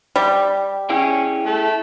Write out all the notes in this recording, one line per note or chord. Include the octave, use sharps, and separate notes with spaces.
G3
C#4 E4 G#4 G5
A3